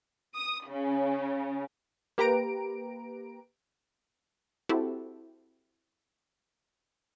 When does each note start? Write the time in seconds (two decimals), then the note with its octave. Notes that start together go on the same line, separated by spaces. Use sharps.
0.34 D#6
0.68 C#3
2.18 A#3 G4 B4 A#5 D7
4.69 C4 E4 F#4 G4 A4